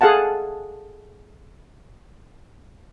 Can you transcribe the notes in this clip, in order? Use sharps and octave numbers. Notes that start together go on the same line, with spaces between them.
G#4 A4 F5 F#5 A5